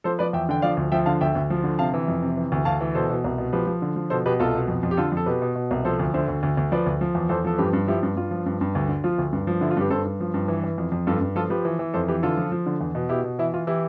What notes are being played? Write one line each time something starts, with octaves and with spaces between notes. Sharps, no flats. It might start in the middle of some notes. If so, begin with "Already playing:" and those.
F3 A4 C5
F3 B4 D5
E2 E5 G5
D3 G5
F3 D5 F5
D2
F3 E5 G5
D3 F5 A5
D2 E5 G5
D2
F3
D3
C3 F5 A5
E3
F2
C3
E3
D2
D2 F5 A5
E3
B2 A4 C5
B2
C2
B2
F3 G4 B4
F3
D3
F3
B2 A4 C5
B2 G4 B4
C2 F4 A4
B2
F2
F2
G4
D3 F4 A4
F2 A4
B2 G4 B4
B2
B2
C2
F3 A4 C5
D2
D3 C5 E5
D2
D2
D2
F3 B4 D5
D2
F3
E2
E2 A4 C5
F3 A4
G2 G4 B4
G2
F3 E4 G4
G2
G2 F4
F3
G2
G2
D2
D3
F3 F4
D2
G2
F3
D3 E4
F4
G2 G4 B4
G2 A4 C5
G2
F3
G2
E3
E3
F2
F2
G2 F4 A4
G2
F3 F4 A4
F3 G4 B4
E3
E3
F2 A4 C5
E3 G4 B4
D3 F4 A4
F3
F3
D3
E2
B2
B2 E4 G4
B2
E3 E4
E3 F4
E3 E4 G4